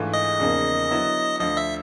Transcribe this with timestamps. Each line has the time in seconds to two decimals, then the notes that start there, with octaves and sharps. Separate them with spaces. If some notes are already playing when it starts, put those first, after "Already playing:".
Already playing: G#2 E3 A3 D4 F4
0.14 D#5
0.39 E2 C#3 F3 A#3 D#4
0.90 D3 F#3 B3 E4
1.40 D2 D3 F3 D#5
1.57 E5